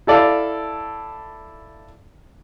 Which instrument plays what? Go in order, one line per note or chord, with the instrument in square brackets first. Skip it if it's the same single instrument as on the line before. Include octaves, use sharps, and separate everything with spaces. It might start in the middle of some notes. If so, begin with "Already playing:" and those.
[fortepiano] E4 A4 D5 F5